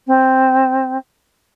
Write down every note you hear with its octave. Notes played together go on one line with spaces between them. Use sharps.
C4